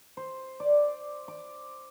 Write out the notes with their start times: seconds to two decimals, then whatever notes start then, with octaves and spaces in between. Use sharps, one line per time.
0.17 C5
0.60 D5
1.28 D6